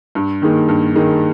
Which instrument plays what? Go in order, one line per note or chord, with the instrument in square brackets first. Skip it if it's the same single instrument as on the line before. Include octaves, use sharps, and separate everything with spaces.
[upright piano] G2
D#3 A#3 D#4 G#4
G2
D#3 A#3 D#4 G#4